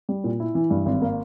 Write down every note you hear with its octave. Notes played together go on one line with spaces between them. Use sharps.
G3
A#2
E4
E3
G2
G#1
A#3